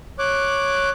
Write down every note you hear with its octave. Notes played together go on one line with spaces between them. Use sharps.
C#5 D6 F#6